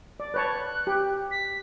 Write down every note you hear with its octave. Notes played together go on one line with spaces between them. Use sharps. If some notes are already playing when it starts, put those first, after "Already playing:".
D5
B4 C#5 A5 F#6
G4
B6